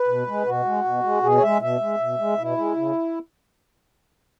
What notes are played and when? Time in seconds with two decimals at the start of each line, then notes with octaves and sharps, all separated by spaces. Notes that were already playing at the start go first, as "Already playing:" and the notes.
Already playing: B4
0.08 B2
0.27 G#3
0.46 B2 F#4
0.65 G#3
0.85 B2
1.03 G#3
1.23 B2 G#4
1.37 C#5
1.42 G#3 E5
1.61 B2 E5
1.80 G#3
2.00 B2
2.19 G#3
2.38 B2 E4
2.57 G#3
2.76 C#3